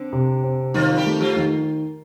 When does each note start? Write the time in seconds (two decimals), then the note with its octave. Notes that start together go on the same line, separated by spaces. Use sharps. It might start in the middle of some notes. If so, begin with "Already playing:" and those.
Already playing: D3 C4 D4
0.13 C3
0.43 C4
0.74 D#3 F3 F4
0.97 G3 G4
1.06 A3
1.20 F3 F4
1.36 D#3